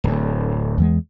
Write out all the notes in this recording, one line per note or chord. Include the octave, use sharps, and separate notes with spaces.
D1 D2
E2 E3 G#3